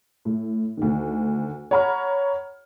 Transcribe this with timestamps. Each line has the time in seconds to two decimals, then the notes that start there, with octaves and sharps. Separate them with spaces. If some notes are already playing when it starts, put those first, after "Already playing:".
0.25 A2
0.77 D2 D#3
1.71 C#5 F#5 A#5 B5 F6